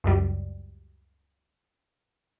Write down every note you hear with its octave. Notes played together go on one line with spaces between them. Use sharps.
C#2 F#2 G3